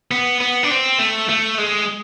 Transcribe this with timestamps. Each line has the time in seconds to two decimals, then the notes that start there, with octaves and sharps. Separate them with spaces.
0.11 B3
0.40 B3
0.63 D4
0.71 C4
0.99 A3
1.29 A3
1.58 G#3